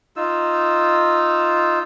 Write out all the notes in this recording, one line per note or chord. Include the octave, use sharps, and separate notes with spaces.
D#4 F4 E6